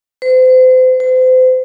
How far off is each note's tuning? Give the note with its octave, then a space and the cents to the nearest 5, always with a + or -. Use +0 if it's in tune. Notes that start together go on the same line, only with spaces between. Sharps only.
C5 -35
C5 -35